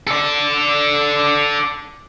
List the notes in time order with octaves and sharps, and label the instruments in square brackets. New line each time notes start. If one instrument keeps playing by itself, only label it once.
[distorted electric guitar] A4 D5